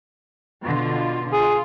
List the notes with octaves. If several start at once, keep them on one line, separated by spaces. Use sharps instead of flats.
B2 D3 F4
F4 G#4